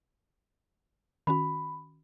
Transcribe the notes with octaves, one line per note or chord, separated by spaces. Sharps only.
D#3 C#4 F#4 B5